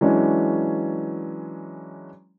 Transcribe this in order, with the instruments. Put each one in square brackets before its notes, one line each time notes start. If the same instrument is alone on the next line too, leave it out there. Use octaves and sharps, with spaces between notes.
[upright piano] E3 F#3 G#3 C#4 D4